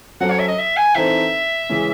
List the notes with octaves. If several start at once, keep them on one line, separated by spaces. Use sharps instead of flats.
F#3 C#4 F#4 A4 C5 F#5
C#5
E5
D#5
E5
G#5
E3 C4 D#4 A4 C5 E5
C#3 E3 G#3 C#4